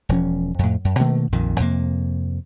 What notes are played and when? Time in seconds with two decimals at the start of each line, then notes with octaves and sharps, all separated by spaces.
0.09 E1 F3 C#4
0.59 F2 A2
0.85 F#2
0.99 B2 D#3 A3 A#3
1.32 A#1 F2 A#2 D#3
1.60 F2 C3 A#3